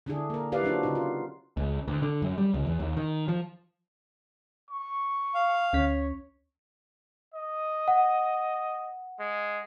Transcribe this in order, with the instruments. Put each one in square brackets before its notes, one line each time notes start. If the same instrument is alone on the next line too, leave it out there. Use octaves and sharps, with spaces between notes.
[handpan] D3 D4 E4 G#4
A#3 A#4
E4 G4 B4 D5 F5
F#3 C4 D4 F4 F#4
C#3 D#4
F4
[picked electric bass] C#2
D2
D3
F#2
G3
C#2
E2
D#2
D#3
F3
[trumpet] C#6
[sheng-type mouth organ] F5
[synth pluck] D2 C#4 B6 [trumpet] C#5
[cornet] D#5
[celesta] F#5
[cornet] G#3